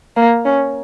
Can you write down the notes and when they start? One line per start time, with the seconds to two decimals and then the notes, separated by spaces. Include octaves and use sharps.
0.16 A#3
0.45 C#4